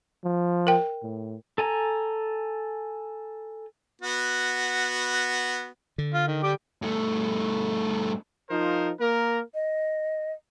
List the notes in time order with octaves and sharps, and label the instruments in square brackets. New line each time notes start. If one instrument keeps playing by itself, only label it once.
[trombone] F3
[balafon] A#4 G5
[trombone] A2
[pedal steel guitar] A4 G#5 A#5
[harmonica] B3 F#4
[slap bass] D3
[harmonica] F4
D#3
G3 G4 D6
[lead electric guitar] G2 A3
[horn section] F3 D#4 F4 A#4 C5
A#3 A#4
[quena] D#5